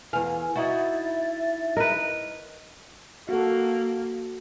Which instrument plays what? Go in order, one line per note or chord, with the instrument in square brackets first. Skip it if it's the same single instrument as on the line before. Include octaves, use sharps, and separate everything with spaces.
[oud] E2 F5 [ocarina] B4 [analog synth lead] G#5
[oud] D#4 E4 F#4 [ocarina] E5 [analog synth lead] A6
[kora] A#4 B4 [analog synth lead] D#5
[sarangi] A#3 [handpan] F#4 A4